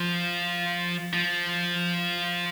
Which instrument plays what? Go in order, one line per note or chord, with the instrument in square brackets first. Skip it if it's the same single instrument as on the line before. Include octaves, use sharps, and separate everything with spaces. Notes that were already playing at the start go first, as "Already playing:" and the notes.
Already playing: [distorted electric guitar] F3
F3